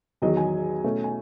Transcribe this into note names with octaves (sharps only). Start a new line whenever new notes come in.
E2 D#3 F#3 D#5
G#5
B2 A3 C#4
G#5